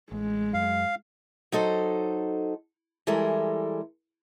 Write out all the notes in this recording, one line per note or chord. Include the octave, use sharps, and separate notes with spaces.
A1 G#3
F#2 F5
F#3 D#4 A4 C5
E3 G3 G#3 A4 A#4